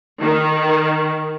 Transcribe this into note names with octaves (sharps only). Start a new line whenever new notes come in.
D#3